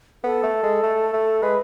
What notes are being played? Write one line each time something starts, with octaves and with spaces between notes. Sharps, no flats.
B3 A4
A3
G#3
A3
A3
G#3 B4